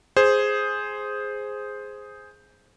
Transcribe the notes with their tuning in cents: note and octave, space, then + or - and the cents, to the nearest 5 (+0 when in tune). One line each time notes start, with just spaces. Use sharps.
G#4 +0 C5 +0